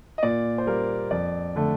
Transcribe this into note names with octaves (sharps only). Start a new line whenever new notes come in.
D#5
A#2 D5
C5
G3 A#3 A#4
F2 D5
D3 A3